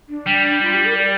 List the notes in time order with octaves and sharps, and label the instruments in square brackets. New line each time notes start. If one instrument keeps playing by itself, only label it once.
[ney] D4
[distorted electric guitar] G3
[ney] D4
F4
G4
A#4
D5